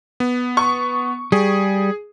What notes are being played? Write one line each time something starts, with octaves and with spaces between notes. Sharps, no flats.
B3
C#6
G3 G#4